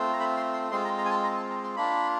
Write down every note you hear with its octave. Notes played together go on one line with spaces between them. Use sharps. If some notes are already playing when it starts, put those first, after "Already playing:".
Already playing: A3 C4 F4
A#5
B5
C6
C6
G#3 C4 F4 C6
A#5
A#5
G#5
A5
A#5
A5
A#5
C6
A#3 D4 F4 B5